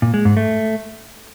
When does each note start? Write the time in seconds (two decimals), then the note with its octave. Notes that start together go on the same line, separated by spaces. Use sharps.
0.02 A#2
0.14 G#3
0.25 G#2
0.37 A3